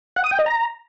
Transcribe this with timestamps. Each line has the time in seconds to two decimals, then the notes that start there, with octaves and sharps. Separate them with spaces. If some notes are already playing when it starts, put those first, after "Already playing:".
0.16 F#5
0.24 D#6
0.31 G5
0.39 D#5
0.46 A#5